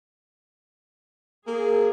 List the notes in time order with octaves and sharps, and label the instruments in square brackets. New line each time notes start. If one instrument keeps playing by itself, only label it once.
[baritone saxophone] A#3 [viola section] G#4